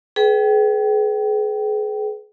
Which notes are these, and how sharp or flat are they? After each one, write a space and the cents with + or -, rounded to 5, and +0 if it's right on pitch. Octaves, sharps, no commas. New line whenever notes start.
G#4 +35 B4 +0 G5 -25